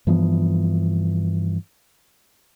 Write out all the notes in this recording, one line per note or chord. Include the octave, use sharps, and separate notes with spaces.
G2 E3 F3 B3